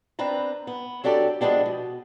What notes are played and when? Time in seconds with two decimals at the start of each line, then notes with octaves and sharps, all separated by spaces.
0.19 C4 D4 B4 A#5
0.67 B3
1.04 F#3 D4 G4 A4 D5
1.41 F3 G#3 B3 D4 G4
1.66 B2